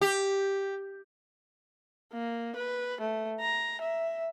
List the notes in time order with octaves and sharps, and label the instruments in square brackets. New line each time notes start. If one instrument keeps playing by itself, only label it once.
[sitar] G4
[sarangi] A#3
B4
A3
A#5
E5